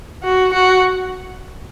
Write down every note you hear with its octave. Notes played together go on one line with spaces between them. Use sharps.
F#4
F#4